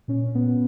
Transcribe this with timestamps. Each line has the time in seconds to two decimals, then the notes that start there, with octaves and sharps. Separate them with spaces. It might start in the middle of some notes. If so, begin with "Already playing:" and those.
0.08 A#2 C#4
0.35 A#2 B3